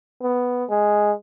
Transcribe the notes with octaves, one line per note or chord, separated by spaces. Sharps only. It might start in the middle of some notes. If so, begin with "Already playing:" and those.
B3
G#3